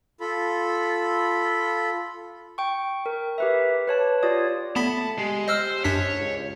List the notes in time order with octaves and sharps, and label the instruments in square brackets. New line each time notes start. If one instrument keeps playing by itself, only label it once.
[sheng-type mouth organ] F4 A4 B5
[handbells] G5 C#6
A#4
G4 B4 E5
B4 C#5 A5
F4 G4 C#5 D5 D#6
[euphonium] A3 [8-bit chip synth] B3 B5 B6 [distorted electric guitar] A5
[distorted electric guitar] G#3 [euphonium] G4
[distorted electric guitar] C5 [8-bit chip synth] D#5 E6 F6
[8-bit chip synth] F#2 D4 B6 [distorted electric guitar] C#5
[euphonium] C#2